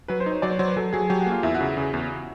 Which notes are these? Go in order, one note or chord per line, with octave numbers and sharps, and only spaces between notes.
F#3 B4
C5
D#4
C#5
F#3 D5
C#5
F#3 C5
B4
F#3 A4
F#3 G#4
F#3 G4
F#4
A#3
F4
E2 E4
F#4
C#3
C#3
E2